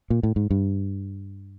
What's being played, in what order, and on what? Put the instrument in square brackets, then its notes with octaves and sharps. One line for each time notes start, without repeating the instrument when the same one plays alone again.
[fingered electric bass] A#2
A2
G#2
G2